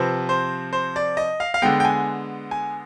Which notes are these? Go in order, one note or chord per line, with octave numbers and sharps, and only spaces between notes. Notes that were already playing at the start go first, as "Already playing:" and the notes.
Already playing: C3 F3 C4 B4
C5
C5
D5
D#5
F5
F5
D3 G#3 B3 G5
G5
G#5
G#5